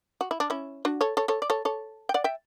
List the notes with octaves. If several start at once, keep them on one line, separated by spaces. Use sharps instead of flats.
F#4
E4
D4
C#4 E4
D4 F#4
A4 C#5
A4 C#5
A4 C#5
D5
A4 C#5
A4 C#5
G5
D5 F#5
E5 G5